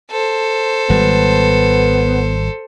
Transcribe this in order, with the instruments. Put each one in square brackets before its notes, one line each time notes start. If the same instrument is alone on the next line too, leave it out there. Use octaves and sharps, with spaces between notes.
[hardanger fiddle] A4 C5
[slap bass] G#1 G3 [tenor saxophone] B3